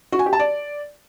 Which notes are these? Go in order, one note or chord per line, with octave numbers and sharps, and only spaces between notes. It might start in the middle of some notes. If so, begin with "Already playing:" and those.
F#4
G#5
G4
A5
D5